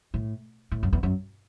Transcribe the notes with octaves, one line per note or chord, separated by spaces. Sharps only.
A2
A2
F#2
E2
F#2